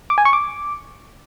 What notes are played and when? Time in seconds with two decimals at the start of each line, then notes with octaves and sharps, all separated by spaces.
0.10 D6
0.18 G#5
0.25 C#6
0.33 D6